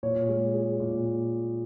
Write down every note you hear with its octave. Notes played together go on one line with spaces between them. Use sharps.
A#2 C#5
G#3
G#3
A#2